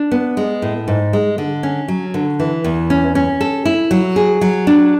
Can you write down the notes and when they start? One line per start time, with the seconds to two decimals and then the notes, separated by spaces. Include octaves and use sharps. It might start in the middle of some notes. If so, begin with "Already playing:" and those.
Already playing: D4
0.12 B3
0.37 G#3
0.62 A2
0.88 G#2
1.13 G#3
1.38 D3
1.63 C#4
1.88 F#3
2.14 D3
2.40 E3
2.64 E2
2.90 C#4
3.15 C#4
3.41 A4
3.65 E4
3.91 F#3
4.16 G#4
4.41 F#3
4.67 D4